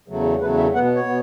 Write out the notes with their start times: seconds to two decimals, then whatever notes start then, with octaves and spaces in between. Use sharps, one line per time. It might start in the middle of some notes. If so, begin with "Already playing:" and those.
0.08 E2 C#3 F#3 A3
0.41 E2 C#3 F#3 A3 B4
0.58 E5
0.73 B2 B3 F#5
0.95 C#5
1.06 B2 B3